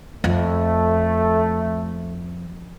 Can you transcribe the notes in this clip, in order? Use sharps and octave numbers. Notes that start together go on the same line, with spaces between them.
F2 A3